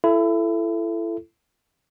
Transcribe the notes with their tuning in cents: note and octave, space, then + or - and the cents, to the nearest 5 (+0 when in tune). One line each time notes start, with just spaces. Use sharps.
E4 +30 A4 +0